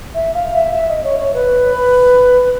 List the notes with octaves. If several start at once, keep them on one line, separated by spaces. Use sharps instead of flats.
E5
F5
E5
E5
D#5
C#5
C#5
B4